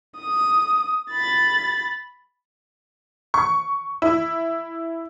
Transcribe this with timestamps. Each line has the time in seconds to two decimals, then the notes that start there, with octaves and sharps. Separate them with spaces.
0.18 D#6
1.12 B5 A6
3.34 C#6
4.02 E4